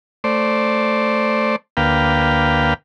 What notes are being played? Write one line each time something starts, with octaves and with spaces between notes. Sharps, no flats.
A3 C5 D5
D2 A#3 B4 F5 G5